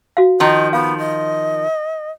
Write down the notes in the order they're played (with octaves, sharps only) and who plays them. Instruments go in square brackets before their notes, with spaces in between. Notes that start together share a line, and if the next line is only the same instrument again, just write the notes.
[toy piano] F#4 F5
[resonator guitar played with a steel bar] D#3 F3 [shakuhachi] D#5
[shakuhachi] B3 [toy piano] F5
[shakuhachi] D#5